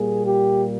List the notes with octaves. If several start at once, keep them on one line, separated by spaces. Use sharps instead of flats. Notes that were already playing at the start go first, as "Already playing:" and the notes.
Already playing: A#2 G3 A#3 G#4
G4